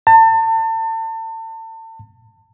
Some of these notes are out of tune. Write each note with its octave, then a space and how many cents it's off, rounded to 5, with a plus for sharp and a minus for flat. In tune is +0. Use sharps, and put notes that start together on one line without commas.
A5 +35